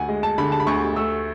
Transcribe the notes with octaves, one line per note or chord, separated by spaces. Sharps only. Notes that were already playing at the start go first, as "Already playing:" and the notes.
Already playing: D2 F#5 G#5
G#3
A5
D3 B5
A5
B5
D2 C#6
A3 E6